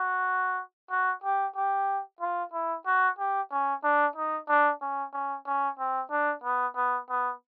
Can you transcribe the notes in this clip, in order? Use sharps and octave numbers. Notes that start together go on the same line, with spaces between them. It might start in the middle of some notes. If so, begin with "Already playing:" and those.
Already playing: F#4
F#4
G4
G4
F4
E4
F#4
G4
C#4
D4
D#4
D4
C#4
C#4
C#4
C4
D4
B3
B3
B3